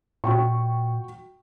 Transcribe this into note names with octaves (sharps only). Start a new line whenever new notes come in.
A#2 F#4 G5 C#6